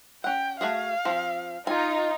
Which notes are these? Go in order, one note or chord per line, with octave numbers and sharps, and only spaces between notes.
C#4 F#5 G5
A3 F#4 G#4 F5
F3 C4
D#4 F4 G#5